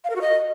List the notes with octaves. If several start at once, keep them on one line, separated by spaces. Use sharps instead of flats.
F5
A#4
F#4
D#5